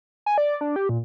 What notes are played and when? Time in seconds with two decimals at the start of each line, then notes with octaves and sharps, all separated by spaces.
0.26 G#5
0.38 D5
0.61 D4
0.76 G4
0.89 A#2